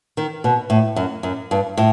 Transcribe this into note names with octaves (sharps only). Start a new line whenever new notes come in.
D#3
B2
A2
F#2
F#2
G2
A2